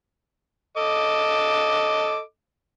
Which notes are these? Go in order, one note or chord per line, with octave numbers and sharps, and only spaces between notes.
A4 D#5 D6